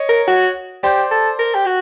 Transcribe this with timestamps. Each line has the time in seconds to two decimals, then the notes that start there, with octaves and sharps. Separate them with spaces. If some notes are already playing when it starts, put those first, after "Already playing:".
Already playing: C#5 D#5
0.09 A#4
0.28 F#4
0.83 G4 C5 D5
1.11 A4
1.39 A#4
1.55 G4
1.66 F#4